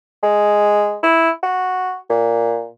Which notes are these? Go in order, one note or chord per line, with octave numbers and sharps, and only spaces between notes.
G#3
E4
F#4
A#2